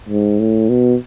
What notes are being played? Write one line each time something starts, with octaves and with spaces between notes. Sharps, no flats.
G#2
A2
B2